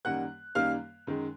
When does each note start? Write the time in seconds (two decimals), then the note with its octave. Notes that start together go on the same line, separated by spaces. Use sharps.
0.05 F#2 D#3 G3 A#3 F#5 F#6
0.55 F#2 D#3 G3 A#3 F5 F6
1.07 F#2 D#3 G#3